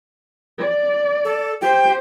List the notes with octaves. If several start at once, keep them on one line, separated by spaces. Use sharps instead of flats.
D5
A4
G4 C5 G5